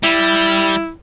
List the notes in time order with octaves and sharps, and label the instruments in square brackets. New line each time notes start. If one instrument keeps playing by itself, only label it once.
[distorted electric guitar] G3 [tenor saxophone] E4